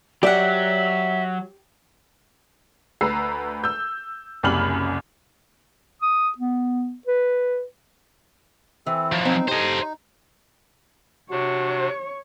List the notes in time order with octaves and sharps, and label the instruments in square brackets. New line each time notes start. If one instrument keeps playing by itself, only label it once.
[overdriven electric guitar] F#3 [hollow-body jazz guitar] G4 [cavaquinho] D5 F#5 [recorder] E5
[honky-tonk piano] D2 B4 A#5 E6 C7
E6 G6
F#1 C2 F#2 B5 F6 F#7
[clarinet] D#6
B3
B4
[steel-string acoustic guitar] E3 [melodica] C4 A4
[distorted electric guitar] F3 F#3
[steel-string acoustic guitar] C4 [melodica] D#4
[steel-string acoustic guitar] G4 A4 [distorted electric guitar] C5 D#5
[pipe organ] C3 D4 [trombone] F#4 [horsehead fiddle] C#5